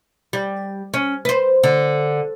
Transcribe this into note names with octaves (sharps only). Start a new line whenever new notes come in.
G3
C#4
B4 C5
D3